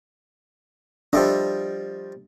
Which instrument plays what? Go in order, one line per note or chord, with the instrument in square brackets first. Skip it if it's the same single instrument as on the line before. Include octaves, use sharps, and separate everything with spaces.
[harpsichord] F3 G3 D#5 [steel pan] D4 A4 E5